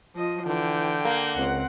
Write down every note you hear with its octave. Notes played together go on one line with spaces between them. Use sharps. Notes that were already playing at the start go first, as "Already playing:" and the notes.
F3 D#5
D3 E3 G5
A#3
C#2 C4 F#5